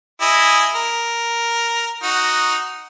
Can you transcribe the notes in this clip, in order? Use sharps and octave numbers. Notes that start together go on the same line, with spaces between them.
E4 G#4 D#5
A#4
D#4 F#4